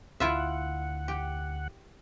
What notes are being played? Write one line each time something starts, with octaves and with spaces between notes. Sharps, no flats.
D2 E4 F4 E5 F#5
G4